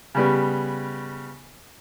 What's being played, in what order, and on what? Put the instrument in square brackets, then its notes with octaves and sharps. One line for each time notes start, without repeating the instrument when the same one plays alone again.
[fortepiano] C#3 G3 B3